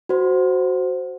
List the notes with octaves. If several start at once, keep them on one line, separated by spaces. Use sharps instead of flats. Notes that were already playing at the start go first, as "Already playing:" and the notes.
F#4 C5